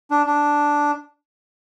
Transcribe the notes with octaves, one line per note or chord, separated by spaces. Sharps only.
D4
D4